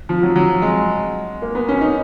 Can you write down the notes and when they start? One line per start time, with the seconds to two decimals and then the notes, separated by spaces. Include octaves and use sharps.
0.09 F3
0.23 F#3
0.36 F#3
0.62 G#3
1.42 A#3
1.55 B3
1.68 C#4
1.81 D#4